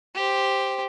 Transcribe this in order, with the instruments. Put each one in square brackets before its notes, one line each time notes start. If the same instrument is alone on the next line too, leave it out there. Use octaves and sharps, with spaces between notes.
[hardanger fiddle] G4 C5